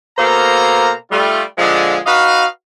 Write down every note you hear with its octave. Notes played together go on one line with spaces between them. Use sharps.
B2 A#3 A4 C5 F5 A#5
G3 A3 F4
A#2 D3 F3 G#3
D#4 F#4 B4 D#5 F5